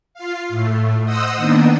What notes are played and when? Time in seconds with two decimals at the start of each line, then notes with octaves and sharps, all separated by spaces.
0.14 F4 F5
0.49 A2 A3
1.04 C5 D#5 F#5 D#6 E6
1.37 D#3 A#3 B3 D4